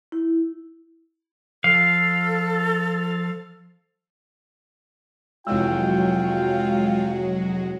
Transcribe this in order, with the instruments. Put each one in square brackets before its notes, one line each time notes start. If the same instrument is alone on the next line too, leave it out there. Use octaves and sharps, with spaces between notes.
[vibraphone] E4
[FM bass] F3 [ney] A4 [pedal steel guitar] F5
[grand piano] F1 E3 E6 [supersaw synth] F#3 G#3 F#4 [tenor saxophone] F4 [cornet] G5